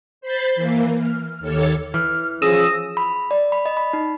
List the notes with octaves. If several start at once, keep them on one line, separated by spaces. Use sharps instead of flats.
C5 B5 C6 G6 A6
E3 A#3
F6
D#2 A4 C#5 D6
E3 F6
F3 C#4 G#4 D#6 E6 A#6
B5
D5
B5
D#5
B5
D#4